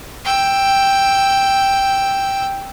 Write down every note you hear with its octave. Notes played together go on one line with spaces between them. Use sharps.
G5 E6